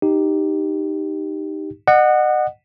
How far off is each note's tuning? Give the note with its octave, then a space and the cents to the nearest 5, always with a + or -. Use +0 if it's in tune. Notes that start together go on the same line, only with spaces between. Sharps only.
D#4 -5 G4 +0
D#5 -40 F#5 +0